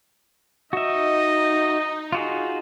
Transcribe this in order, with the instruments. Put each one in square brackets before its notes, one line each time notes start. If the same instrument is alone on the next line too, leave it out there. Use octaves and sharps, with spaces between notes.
[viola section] D#4 [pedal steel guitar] F#4 E5 [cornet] D#5
[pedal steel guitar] F4 F#4 G#4